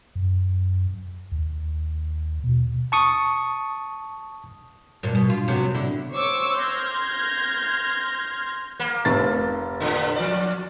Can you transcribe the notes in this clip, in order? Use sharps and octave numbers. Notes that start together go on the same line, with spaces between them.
F#2
D#2
B2
A5 C#6 D#6
G2 A#2
B2
F4
C3 F#3 B3
D3 E4
C5 C#5 C#6 D6 E6
C6 F6 G6 G#6 A#6
A#3
F1 A6
A2 D3
F3 D5